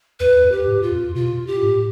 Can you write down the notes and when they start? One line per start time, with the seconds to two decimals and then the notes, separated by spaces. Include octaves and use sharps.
0.20 E2 B4
0.44 F2
0.52 G4
0.67 A2
0.83 F4
0.91 F2
1.15 B2 F4
1.47 G4
1.62 A2